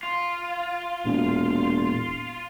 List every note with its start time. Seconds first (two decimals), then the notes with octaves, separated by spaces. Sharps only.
0.03 F4
1.05 E1 A#2